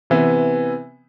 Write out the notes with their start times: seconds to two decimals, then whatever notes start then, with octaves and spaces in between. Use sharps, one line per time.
0.10 C3 E3 B3